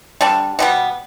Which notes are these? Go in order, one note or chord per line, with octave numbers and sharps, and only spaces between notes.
D3 G3 D4
B2 G3 B3